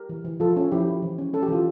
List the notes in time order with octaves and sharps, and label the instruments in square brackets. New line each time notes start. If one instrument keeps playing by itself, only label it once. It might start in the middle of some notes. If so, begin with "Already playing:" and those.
Already playing: [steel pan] G4 A#4
E3
E3
F3 F4 A4
C#4
F3 E4 G4
F3
E3
C#4
C#4 A4
G4
E3 F4